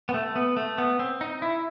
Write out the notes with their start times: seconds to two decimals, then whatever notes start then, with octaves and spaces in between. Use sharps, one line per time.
0.09 B3
0.14 A3
0.36 B3
0.57 A3
0.78 B3
0.99 C4
1.21 D#4
1.42 E4